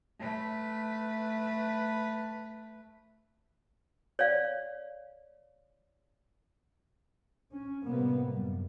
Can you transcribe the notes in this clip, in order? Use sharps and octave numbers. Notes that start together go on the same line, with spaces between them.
A3 B4
C#5 D5 F5
C#4
A2 C3 G3 A#3 B3
F#2 G3